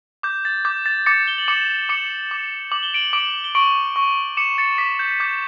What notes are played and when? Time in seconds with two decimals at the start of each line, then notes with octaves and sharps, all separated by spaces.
0.23 D6 G6
0.45 A6
0.65 D6 G6
0.86 A6
1.06 D6 A6 C#7
1.28 G7
1.38 F#7
1.48 D6 C#7 E7
1.89 D6 C#7 E7
2.31 D6
2.72 D6 F#7
2.83 G7
2.94 D7 F#7
3.13 D6 D7 F#7
3.44 G7
3.55 C#6 D7 F#7
3.96 C#6
4.37 D6 C#7 E7
4.58 A6 C#7
4.78 D6 B6
4.99 G6
5.20 D6 G6